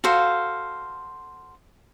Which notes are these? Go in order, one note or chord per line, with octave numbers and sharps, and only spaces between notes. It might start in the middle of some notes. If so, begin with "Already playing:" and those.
F#4 A4 C5 F5